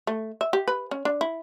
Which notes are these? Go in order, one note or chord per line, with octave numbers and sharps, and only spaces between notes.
A3
E5
G4
B4
C#4
D4
E4